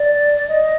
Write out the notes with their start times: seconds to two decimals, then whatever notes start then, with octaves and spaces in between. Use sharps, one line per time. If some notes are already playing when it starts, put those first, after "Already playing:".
Already playing: D5
0.48 D#5